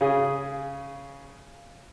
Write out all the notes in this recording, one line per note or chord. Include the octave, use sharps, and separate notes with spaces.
C#3 G#4